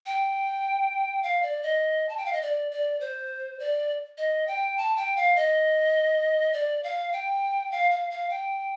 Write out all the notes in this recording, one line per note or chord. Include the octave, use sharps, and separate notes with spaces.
G5
F5
D5
D#5
A5
G5
F5
D#5
D5
D5
C5
D5
D#5
G5
A5
G5
F5
D#5
D5
F5
G5
F5
F5
F5
G5